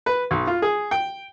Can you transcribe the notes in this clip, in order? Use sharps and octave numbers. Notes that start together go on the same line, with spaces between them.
B4
B1
F4
G#4
G5